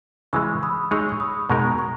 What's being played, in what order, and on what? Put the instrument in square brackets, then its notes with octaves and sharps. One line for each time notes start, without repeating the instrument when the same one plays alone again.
[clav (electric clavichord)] C#3 E3 G#3 [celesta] C#6 E6
[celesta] B5 D#6
[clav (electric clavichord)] G#3 D#4 G#4 C#5 [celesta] C#6 E6
[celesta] C#6
B5 D#6
[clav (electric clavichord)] B2 G#3 D#4 A#4 [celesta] A#5 C#6
[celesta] A#5 C#6